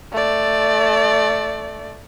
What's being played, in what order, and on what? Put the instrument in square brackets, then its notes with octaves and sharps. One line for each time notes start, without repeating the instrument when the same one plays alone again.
[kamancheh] A3 D5